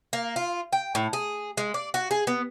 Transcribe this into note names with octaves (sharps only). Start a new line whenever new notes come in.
A#3
F4
G5
A2
G#4
G#3
D5
F#4
G#4
B3